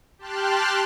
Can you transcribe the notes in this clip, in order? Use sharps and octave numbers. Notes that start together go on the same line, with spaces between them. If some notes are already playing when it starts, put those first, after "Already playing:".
G4 G5 A5 C6 F6 F#6